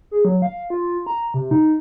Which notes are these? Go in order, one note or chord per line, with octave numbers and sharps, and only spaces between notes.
G#4
F#3
F5
F4
A#5
C3
D#4